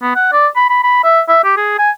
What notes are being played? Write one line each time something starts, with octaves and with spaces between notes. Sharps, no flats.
B3
F#5
D5
B5
B5
B5
E5
E5
G4
G#4
G#5